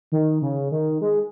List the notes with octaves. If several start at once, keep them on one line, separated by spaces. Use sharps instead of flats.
D#3
C#3
D#3
G#3